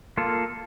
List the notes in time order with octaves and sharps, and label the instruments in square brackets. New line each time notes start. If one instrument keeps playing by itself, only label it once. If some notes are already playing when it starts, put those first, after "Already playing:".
[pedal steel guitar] A#3 F4 A4